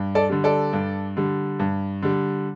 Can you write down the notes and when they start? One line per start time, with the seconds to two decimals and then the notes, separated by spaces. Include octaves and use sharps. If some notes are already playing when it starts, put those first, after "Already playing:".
Already playing: G2
0.15 A4 D5
0.30 D3 G3
0.44 A4 D5
0.73 G2
1.17 D3 G3
1.59 G2
2.02 D3 G3